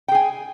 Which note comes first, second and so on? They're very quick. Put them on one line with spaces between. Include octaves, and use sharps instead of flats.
G5 G#4 G#5